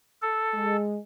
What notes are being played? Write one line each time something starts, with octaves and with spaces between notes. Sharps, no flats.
A4
G#3